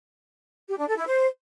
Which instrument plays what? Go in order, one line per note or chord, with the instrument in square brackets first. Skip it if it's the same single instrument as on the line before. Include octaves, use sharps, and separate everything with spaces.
[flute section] G4
D4
A4
E4
C5